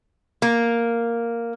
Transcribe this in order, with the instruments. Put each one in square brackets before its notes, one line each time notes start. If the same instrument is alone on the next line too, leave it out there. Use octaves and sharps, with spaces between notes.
[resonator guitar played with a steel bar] A#3